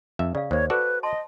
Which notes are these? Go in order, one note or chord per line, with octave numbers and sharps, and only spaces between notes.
F2 E5
C#3 D5 F5
D#2 A#3 C5 C#5
F#4 A4 B4 D5
D#5 A5 C6